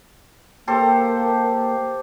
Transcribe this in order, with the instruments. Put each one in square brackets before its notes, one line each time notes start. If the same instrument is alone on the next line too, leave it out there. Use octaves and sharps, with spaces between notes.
[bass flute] A#3 [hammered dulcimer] G4 A4 C5